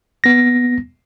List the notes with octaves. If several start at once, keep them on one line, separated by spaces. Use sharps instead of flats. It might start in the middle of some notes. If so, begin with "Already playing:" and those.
B3 A#6